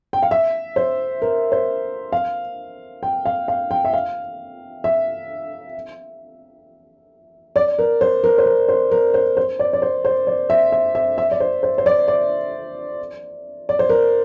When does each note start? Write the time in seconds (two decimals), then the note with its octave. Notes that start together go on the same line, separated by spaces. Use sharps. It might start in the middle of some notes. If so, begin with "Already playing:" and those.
0.13 G5
0.23 F5
0.31 E5
0.76 C5
1.22 A#4
1.52 C5
2.12 F5
3.03 G5
3.25 F5
3.48 F5
3.71 G5
3.85 E5
3.93 F5
4.84 E5
7.56 D5
7.79 A#4
8.01 C5
8.24 A#4
8.38 C5
8.46 A#4
8.69 C5
8.92 A#4
9.14 C5
9.37 C5
9.59 D5
9.73 D5
9.82 C5
10.05 C5
10.27 D5
10.50 E5
10.72 E5
10.95 E5
11.18 E5
11.31 D5
11.40 C5
11.63 C5
11.78 C5
11.86 D5
12.08 D5
13.69 D5
13.79 C5
13.89 A#4